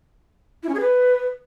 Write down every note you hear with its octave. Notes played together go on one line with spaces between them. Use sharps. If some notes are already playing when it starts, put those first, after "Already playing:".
E4
C#4
G#4
B4